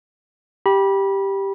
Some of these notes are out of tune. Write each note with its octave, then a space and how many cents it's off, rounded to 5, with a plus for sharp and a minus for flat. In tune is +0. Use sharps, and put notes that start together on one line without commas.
G4 +0 B5 -25